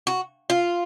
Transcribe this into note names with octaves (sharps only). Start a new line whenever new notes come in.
F#4
F4